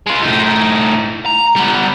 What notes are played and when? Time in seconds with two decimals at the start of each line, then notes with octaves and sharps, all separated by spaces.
0.07 G#3 F4
0.23 A2 D#4
1.26 A#5
1.56 G3 B3